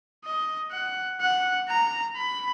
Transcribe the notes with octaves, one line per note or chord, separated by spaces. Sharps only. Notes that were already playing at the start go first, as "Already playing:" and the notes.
D#5
F#5
F#5
A#5
B5